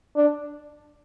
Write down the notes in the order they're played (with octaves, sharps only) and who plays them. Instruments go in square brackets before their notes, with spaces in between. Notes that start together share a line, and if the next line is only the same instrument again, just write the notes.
[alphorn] D4